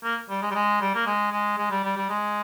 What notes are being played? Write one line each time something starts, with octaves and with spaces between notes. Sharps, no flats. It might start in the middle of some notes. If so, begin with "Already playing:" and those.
A#3
G3
G#3
G3
G#3
G3
A#3
G#3
G#3
G#3
G3
G3
G3
G#3